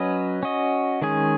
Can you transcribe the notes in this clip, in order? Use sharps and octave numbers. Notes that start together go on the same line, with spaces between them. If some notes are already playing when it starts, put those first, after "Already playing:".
Already playing: F#3 C#4 B4 D#5
C#4 F#4 D#5
D#3 G#3 C#4 G#4